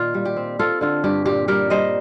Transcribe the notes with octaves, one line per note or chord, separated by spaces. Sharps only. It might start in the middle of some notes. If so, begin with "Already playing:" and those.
Already playing: A#2 D#3 F4
G3
G4
C4
C4 F4 A4
D3 F4
G2 G4
A#2 G4
G3 G4 A#4
G3 C5 D#5